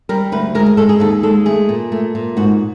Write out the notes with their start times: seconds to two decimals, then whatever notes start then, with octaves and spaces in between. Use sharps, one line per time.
0.09 G3 A#4
0.32 D2 B4
0.55 G#3 A#4
0.66 A#4
0.77 G#3 A4
0.89 G#4
1.00 D#2 A4
1.23 G#3 A4
1.46 A3 G#4
1.69 A#2
1.92 A3
2.15 A#2
2.37 G#2 F#4